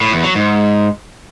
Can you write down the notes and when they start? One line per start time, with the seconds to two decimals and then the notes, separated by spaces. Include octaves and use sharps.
0.01 A2
0.12 E2
0.24 F#3
0.35 G#2